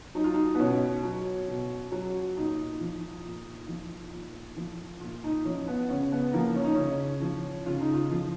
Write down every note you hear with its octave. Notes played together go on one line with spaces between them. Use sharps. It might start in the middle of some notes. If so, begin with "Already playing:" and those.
F#3 D#4
F4
D#4
B3
B2 C#4
F#3
B2
F#3
A#2 D#4
F3
A#2
F3
A#2
F3
A#2 F4
D#4
F3 C#4
B3
C#3 C#4
B3
F3 A#3
C#4
D#4
C#3 C#4
F3
C#3 F4
D#4
F4
F3